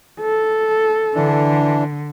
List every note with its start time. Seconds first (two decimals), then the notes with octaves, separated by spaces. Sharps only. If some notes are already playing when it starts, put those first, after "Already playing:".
0.21 A4
1.15 D3 E3 D4